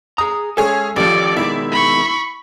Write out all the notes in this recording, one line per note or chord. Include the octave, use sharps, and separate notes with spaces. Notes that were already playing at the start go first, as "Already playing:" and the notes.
G#4 A#5 D#6
G#3 C#4 G#4 A4 C#5
A1 D#3 F3 G4 A4 D5 D6
B2 D#3 G#3 E4
B5 C#6